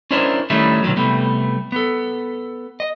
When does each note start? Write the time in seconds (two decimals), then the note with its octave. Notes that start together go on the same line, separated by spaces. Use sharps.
0.11 C#4 D4 E4 A#4 C5 D#5
0.50 D#3 G3 A3 C#4 D#4 E4
0.83 B2 D3 D#3 F#3 G3
0.97 C3 G3 A3 B3
1.72 B3 A4
2.80 D#5